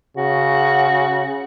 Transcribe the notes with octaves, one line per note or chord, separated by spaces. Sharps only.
C#3 F#4